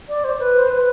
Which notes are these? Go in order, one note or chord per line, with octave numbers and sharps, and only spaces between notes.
D5
C5
B4
C5
B4